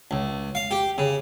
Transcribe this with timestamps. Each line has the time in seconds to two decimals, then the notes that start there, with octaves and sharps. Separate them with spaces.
0.11 C#2
0.55 F5
0.71 G4
0.98 C#3